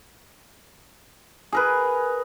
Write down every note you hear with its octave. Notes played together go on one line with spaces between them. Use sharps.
G#4 A#4 B4